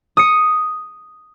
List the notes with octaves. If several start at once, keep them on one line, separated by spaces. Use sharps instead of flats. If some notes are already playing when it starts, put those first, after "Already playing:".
D#6 C#7